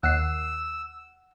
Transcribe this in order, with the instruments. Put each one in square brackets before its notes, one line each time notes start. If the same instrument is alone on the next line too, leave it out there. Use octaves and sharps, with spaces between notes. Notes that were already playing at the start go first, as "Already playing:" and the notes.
[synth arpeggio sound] D#2 C7 [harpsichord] F#5 [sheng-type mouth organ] E6